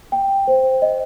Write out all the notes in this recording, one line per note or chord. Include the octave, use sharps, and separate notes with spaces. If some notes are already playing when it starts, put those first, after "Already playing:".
G5
C5
D#5